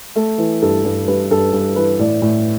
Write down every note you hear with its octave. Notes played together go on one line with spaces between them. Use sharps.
A3 A4
E3
G2 A4
G2
G2 B4
G2 A4
G2
E3 B4
A2 D5
A2